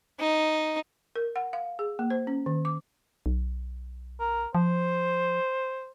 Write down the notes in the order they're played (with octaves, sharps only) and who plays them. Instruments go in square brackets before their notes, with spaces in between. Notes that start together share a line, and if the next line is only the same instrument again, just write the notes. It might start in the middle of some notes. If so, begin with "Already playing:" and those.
[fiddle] D#4
[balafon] A#4
F#5
F5
G#4
A#3
C5
C#4
D#3
D6
[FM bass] B1
[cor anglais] A#4
[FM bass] F3 [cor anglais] C5